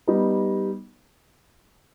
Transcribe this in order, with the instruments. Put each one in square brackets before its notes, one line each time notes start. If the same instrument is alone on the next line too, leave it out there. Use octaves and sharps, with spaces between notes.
[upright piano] G3 B3 D#4